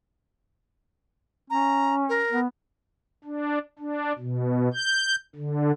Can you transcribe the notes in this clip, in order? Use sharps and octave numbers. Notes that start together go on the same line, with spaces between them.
C#4 A#5
A#4
B3
D4
D4
B2
G6
D3